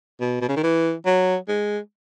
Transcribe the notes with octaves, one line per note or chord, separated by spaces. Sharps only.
B2
B2
C#3
D#3
E3
F#3
G#3